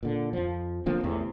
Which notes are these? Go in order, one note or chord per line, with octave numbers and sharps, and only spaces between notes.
A#2 D3
F2 F3
D3 F3 A#3 C4
A1 E2 A2 C3